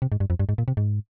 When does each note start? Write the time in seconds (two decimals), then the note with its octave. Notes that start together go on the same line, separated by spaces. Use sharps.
0.02 C3
0.12 G#2
0.20 G2
0.30 F2
0.40 G2
0.49 G#2
0.58 A#2
0.68 C3
0.77 G#2